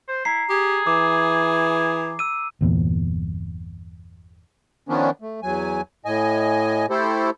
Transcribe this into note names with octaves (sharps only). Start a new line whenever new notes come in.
C5
E4 A#5 C7
G4 G#4
E3 D6
E6 D#7
G1 E2 A#2
D#3 F3 B3 C#4 D4
A3
E2 F#3 G#5
A2 D#5 G#5
A3 E4 G4 A4 C5